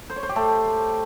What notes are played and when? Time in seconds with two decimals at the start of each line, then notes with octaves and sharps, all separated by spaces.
0.10 C5
0.16 C#5
0.23 C5
0.29 G4
0.36 A3